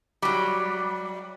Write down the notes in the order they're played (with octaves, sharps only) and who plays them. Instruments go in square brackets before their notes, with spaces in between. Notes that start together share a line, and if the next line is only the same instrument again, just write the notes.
[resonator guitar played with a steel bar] F#3 G3